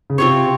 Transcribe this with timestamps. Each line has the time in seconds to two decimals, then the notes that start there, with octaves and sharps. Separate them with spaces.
0.10 C#3
0.18 C3 C4 F4 G#4 C#5